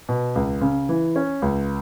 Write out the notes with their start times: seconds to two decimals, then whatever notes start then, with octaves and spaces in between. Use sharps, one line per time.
0.09 B2
0.35 C#2
0.61 C#3
0.89 E3
1.16 C#4
1.42 C#2